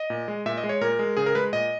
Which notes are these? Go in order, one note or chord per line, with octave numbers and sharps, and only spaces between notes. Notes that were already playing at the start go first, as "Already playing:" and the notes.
Already playing: D#5
A#2
G#3
A#2 E5
D#5
G#3
C#5
A#2 A#4
G#3
C#3 G#4
A#4
G#3 B4
A#2 D#5